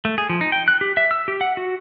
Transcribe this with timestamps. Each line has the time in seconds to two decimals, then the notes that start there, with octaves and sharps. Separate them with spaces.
0.05 A3
0.18 G#4
0.30 F3
0.41 D#4
0.52 G5
0.68 F#6
0.81 G4
0.97 E5
1.11 E6
1.28 G4
1.41 F#5
1.57 F#4